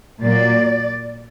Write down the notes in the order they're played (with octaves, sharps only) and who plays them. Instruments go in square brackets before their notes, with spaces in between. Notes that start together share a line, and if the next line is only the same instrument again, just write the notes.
[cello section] A#2 F#3 A#3 D5